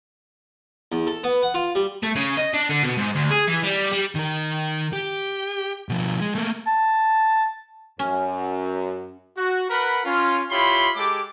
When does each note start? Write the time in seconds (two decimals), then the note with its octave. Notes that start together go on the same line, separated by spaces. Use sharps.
0.92 E2
1.07 A4
1.24 B3
1.43 F#5
1.54 F4
1.75 G3
2.03 A3
2.16 C#3
2.38 D#5
2.54 D4
2.69 D3
2.83 B2
2.97 G#2
3.15 D2
3.31 G#4
3.48 E3
3.63 G3
3.92 G3
4.15 D#3 A#4
4.93 G4
5.89 B2 F3
6.21 G#3
6.35 A3 A#3
6.67 A5
7.99 F#2 C#4
9.37 F#4
9.69 A#4 B4 F#5 B5
10.05 C#4 F4
10.50 E4 F4 G4 C#5 B5 C6
10.96 G#3 G4 A4 D6